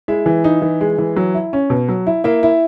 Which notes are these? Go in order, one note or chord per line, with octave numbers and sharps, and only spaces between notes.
G#3 E4 E5
E3
D#4
E3
G#3
E3
F#3
E4
C#4
B2
F#3
E4
A#3 E4 E5
E4